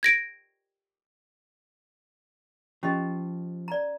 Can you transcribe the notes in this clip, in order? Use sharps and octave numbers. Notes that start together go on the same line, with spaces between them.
G#6 A#6 D7
F3 C#4 G4 D#5
D5 A#5